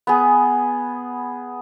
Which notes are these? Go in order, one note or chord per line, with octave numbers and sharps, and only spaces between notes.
B3 G#4